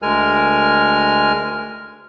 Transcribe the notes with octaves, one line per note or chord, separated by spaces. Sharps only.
D2 G#3 A#4 G#5 F6